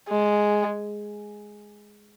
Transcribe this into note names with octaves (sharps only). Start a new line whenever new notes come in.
G#3